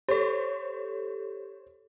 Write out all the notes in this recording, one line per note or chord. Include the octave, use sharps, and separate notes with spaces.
G4 A4 C5 C#5